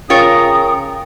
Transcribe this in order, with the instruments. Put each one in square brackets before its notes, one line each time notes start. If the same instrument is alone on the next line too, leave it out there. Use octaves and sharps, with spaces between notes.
[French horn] C#3 [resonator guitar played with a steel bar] F4 A#4 C#5 [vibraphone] G5 [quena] D#6